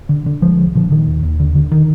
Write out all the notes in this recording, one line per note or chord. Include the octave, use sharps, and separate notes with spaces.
D3
D3
C2 F3 G#3
C2
A#2 D3 F3
A#2 D#3
D#2
D#2
D3
D3
D#3